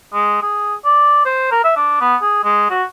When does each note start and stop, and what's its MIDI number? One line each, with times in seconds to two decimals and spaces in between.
0.13 0.40 56
0.42 0.75 68
0.85 1.23 74
1.25 1.48 72
1.52 1.63 70
1.64 1.73 76
1.76 1.99 62
2.01 2.16 59
2.22 2.43 68
2.44 2.67 56
2.70 2.83 66